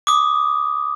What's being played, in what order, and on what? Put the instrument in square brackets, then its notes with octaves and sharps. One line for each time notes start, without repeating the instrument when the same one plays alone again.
[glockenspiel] D6 D#6